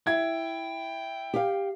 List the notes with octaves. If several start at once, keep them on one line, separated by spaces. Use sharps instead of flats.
E4 G5 G#6
G4 F5